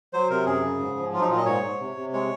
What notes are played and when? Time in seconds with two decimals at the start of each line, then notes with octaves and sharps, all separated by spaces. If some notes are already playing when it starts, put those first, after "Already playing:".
0.13 F#3 C5
0.30 C3 A#4
0.46 F#2 G#4
0.64 C#3
0.79 G#2
0.96 F3
1.13 F#3 F4
1.21 D#4
1.29 A#2 F4
1.38 D#5
1.46 G#2 C#5
1.63 G#2
1.79 C3
1.96 C3
2.13 G#3 C#5